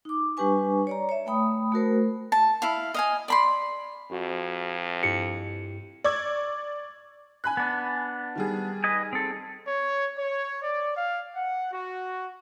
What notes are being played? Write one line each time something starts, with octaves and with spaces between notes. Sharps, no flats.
D#4 D6
G3 D4 G4 B4 G#5 C#6
C#5 D5 A#5
C#5 E5
A3 G5 B5 D#6
A3 F#4 A#4 C5
A5
E4 F5
D#5 F5 G#5
D5 B5 C6
F2 F#4
G2 E4 G4 C#7
D5 C#6 D6 E6 G#6
G#5 B5 F#6
B3 D4
D#3 G3 G#4
B4 D#5 G#5
C4 A4
C#5
C#5
D5
F5
F#5
F#4